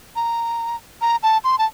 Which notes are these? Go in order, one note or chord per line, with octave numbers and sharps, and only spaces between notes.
A#5
A#5
A5
C6
A5